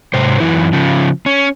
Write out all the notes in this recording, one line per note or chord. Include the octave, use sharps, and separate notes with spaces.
G#2 C3 C5
F#2 E3 E4
C#3 F3
C#4